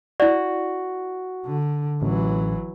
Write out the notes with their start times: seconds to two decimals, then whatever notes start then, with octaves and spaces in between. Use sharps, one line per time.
0.20 E4 F#4 D5
1.46 D3
2.02 A1 E3 F#3